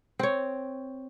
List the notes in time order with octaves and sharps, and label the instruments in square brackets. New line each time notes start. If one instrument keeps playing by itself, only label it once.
[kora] C4 C#5